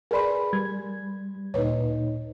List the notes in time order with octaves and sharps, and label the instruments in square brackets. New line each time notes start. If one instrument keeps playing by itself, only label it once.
[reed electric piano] G#4 B4 B5 [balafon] A#4 D5 C6
[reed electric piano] G3 G#6
[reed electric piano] D2 A#2 D#4 [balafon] B4 C#5